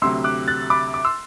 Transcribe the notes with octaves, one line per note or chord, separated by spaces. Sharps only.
D2 C3 F#3 C6 E6
D6 F#6
F#6 A6
B5 D6
D6
C6 E6